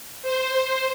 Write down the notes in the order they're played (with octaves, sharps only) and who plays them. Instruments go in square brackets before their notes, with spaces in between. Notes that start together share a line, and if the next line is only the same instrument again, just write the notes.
[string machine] C5